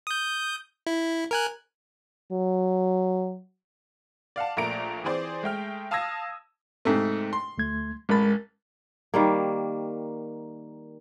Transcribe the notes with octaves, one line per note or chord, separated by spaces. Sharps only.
D#6 G6
E4
A#4 G#5 F#6
F#3
D5 F5 F#5 A5
A#1 A3 A#3 D5 A#5 D7
E3 C4 G#4 C5 D5
G#3 A3 G5 F6
F5 A5 D#6 E6 G#6 A#6
G#2 C3 A3
C6
D2 A3 G#6
A1 G#3 A#4 B5 A6
D#3 G3 A#3